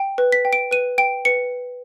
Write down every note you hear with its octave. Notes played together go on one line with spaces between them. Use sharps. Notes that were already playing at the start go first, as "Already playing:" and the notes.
Already playing: G5
B4
B6
G5
D7
B4 D#7
G5 D7
B4 C#7